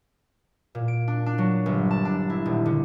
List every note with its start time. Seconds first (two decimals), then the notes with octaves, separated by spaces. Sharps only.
0.75 A#2
0.88 D7
1.08 D4
1.26 D4
1.38 F#3
1.66 G1
1.90 A5
2.05 D4
2.30 E4
2.46 D#1
2.66 D3